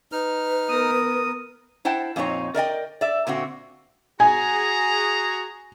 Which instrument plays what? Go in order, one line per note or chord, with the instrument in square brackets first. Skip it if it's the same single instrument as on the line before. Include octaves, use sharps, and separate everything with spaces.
[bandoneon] D#4 F6 [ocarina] B4
[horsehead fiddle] B3 A#4 [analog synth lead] D#6
[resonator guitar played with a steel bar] E4 C5 F#5 G5 A5
F2 A#2 C4 D#4 C#5
A#4 D5 D#5 G5
D5 E5
A#2 D3 C4 F#4
[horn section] F#4 G#4 A#5 [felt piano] G#5